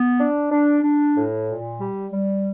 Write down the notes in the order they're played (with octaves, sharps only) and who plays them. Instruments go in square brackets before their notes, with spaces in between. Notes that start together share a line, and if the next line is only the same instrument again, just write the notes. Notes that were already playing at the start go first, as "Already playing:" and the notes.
Already playing: [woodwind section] B3
D4
D4
D4
A2
A#2
G3
G3